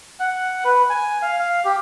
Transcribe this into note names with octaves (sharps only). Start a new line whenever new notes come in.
F#5
B4
G#5
F5
F5
G4